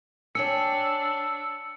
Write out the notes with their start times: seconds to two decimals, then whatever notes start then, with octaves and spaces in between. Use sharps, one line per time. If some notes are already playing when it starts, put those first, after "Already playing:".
0.35 D4 C#5 G5 G#5 E6 C#7